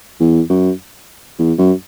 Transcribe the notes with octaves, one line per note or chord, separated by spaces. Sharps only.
E2
F#2
E2
F#2